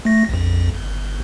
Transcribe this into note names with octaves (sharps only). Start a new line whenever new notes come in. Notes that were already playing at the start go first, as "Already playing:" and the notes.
A3 A#6
A#1 F2
G1